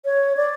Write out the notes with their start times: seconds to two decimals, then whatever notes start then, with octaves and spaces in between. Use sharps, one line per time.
0.05 C#5
0.37 D5